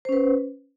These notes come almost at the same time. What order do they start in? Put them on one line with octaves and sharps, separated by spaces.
C5 C#4 B4